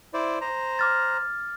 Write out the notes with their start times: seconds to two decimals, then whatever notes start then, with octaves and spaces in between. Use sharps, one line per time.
0.14 E4 C5 D5
0.41 C5 A#5
0.79 D6 F6 A6